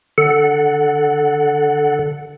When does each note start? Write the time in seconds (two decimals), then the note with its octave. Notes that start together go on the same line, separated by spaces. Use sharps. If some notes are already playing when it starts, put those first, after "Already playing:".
0.18 D3 A4 F#5